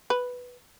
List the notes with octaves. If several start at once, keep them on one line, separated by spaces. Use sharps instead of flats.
B4